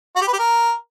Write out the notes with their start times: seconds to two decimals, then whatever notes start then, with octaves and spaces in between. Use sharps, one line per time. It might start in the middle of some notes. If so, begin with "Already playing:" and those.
0.16 F#4
0.22 G4
0.28 B4
0.33 G4
0.39 A#4